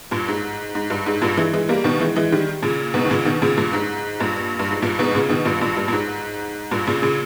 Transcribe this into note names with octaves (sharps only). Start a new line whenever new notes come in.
G2 A#2
G#2
G#2
G2
G#2
G2 A#2
E3 G#3
E3 G#3
G3 A#3
B2 D#3
E3 G#3
E3 G#3
D#3 G3
A#2 C#3
G#2 B2
D#3
A#2 C#3
B2 D#3
A#2 C#3
G2 A#2
G#2
G2 A#2
G2
G#2
G2 A#2
G#2 B2
A#2 C#3
B2 D#3
G2 A#2
G2 A#2
G2
A#2
G#2
G2 A#2
A#2 C#3
A#2 C#3